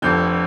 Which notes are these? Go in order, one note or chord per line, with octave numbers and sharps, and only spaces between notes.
F1 F2 D3 G6